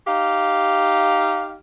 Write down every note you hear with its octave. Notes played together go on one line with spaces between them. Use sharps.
D#4 G4 F5